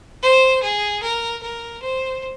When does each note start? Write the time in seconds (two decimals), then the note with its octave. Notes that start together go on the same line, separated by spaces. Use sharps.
0.22 C5
0.62 G#4
1.02 A#4
1.42 A#4
1.81 C5